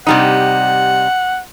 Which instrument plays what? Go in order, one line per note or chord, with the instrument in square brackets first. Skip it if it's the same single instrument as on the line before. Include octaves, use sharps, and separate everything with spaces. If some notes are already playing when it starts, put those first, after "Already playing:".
[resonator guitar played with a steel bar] C3 G3 D#4 [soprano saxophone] F#5